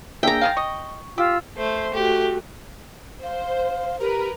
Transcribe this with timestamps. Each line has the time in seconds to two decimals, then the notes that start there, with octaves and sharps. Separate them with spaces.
0.23 A#3 D4 G#4 E5 G5 A#5
0.41 D#3 G#3 F5
0.57 D#5 C#6
1.18 F4 G4 E6
1.57 A3 C5
1.94 A3 F#4 G4
3.23 C5 F5
4.01 G4 A#4 B4